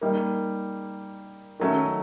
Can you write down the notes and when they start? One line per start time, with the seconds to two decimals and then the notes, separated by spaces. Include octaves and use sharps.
0.01 G3 A#3 D#4
1.60 D#3 F#3 A3 C#4